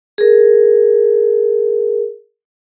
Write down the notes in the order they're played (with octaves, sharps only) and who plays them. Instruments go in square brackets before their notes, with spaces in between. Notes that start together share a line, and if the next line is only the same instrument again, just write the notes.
[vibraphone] G#4 A#4